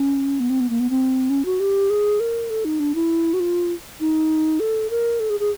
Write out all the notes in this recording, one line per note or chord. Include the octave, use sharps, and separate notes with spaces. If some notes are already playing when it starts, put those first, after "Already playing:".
Already playing: C#4
B3
C4
B3
A#3
B3
C4
C#4
F#4
G4
G#4
A#4
A4
D#4
D4
E4
F#4
F4
D#4
A4
A#4
A4
G#4
G#4